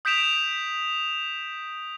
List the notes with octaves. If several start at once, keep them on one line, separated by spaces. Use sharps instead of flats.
D#6 G6 B6 D7 E7 F7